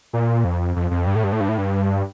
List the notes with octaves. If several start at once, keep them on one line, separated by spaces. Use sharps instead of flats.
A#2
F2
F2
F2
G2
A2
G2
A2
G2
A2
G2